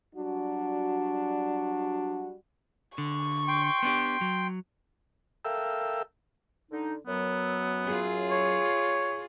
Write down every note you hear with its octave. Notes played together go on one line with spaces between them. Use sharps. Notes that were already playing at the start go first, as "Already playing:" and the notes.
F#3 G3 D4 F#4
D3 C#6
G5 C6
B3 D4 G4
F#3
A4 A#4 E5 F5 G5 E6
D3 D#4
F#2 F#3 B3
F4 G#4
C#5